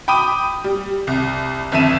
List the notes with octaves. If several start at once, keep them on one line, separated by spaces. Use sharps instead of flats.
G5 B5 D6 D#6 D#7
G3
C2
G1 F2 E5 A5 D#7 E7